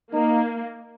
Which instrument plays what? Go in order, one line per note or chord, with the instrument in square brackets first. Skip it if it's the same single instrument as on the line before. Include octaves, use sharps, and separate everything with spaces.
[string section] A#3 [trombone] D#4